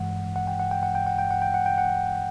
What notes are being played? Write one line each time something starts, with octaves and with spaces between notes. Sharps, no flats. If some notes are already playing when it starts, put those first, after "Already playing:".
Already playing: G2 E3 G#3 F#5
F#5
G5
F#5
G5
F#5
G5
F#5
G5
F#5
G5
F#5
G5
F#5